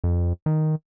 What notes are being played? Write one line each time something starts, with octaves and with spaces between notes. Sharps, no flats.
F2
D#3